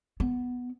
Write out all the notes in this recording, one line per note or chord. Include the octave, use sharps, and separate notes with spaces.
B3